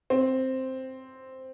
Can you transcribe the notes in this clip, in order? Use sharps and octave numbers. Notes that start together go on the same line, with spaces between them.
C4